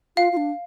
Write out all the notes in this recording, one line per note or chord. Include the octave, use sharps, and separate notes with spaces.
F4 F5
F4
D4